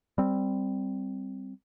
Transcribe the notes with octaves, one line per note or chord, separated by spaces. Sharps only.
G3 C4